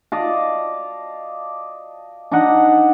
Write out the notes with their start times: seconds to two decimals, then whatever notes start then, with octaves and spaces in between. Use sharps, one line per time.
0.12 D5 D#5 F5 A5
2.32 D4 D#4 D#5 F#5